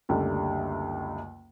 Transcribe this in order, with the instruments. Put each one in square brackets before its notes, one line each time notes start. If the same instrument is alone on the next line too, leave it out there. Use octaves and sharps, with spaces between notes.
[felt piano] F#1 C#2 D3 G3 A3